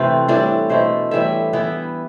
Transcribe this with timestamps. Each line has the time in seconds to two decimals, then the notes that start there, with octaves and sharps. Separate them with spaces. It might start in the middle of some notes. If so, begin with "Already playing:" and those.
Already playing: C3 E3 A3 C4 B4
0.28 A2 E3 G3 D4
0.69 B2 A3 E4 C5
1.11 A2 E3 G3 E5
1.53 E3 B3 E4